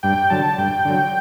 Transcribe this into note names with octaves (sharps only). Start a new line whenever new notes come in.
G2 G5
D3 F#3 A5
G2 G5
D3 F#3